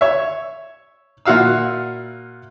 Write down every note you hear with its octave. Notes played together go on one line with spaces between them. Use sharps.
C#5 E5
A#2 E4 F#4 F5 E6